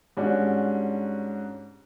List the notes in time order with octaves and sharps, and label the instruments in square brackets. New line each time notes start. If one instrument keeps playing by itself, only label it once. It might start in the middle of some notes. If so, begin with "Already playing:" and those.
[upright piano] G#2 G3 C#4 D4 F#4